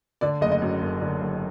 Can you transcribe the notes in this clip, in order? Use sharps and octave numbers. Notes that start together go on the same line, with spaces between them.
D3 D5
F#1 D#5
D#5
F#2
F#1
D3
F#1